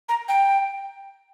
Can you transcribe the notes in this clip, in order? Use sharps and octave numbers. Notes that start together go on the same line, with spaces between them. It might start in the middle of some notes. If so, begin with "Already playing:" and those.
A#5
G5